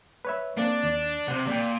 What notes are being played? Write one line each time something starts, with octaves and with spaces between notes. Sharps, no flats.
B4 C#5 E5
A#3 C4 D4
D#2 D5
C3 C5 F#5
A#2 D5 G5